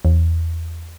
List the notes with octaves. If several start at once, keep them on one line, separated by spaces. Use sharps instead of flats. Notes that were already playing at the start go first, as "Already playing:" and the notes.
E2